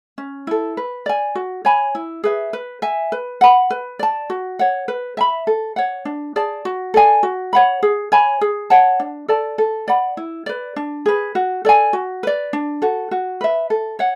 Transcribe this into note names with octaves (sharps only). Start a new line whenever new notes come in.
C#4
E4 A4
B4
D5 G#5
F#4
C#5 G#5 B5
E4
G#4 B4 E5
B4
E5 G#5
B4
F#5 B5
B4
D5 A5
F#4
C#5 F#5
B4
E5 G#5 B5
A4
C#5 F#5
D4
G#4 D5 A5
F#4
A4 D5 G#5
F#4
C#5 F#5 B5
G#4
C#5 G#5 B5
G#4
C#5 F#5 A5
D4
A4 D5 A5
A4
D5 F#5 B5
E4
B4 D5
D4
G#4 B4
F#4
A4 D5 G#5
F#4
B4 D5
D4
F#4 A4
F#4
B4 E5
A4
C#5 F#5